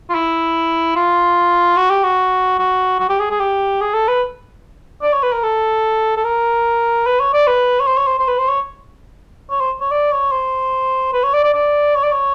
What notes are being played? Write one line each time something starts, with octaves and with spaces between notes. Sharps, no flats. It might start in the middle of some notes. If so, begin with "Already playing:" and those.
F4
E4
F4
F#4
G4
F#4
F#4
F#4
G4
G#4
G#4
G4
G#4
A4
B4
D5
C#5
B4
A#4
A4
A4
A#4
B4
C#5
D5
B4
C#5
C5
C#5
C5
C5
B4
C5
C#5
C#5
C5
C#5
D5
C#5
C5
B4
C#5
D5
D5
D5
C#5
D5
C#5